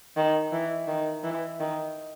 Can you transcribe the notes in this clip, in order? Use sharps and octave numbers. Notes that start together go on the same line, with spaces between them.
D#3
E3
D#3
E3
D#3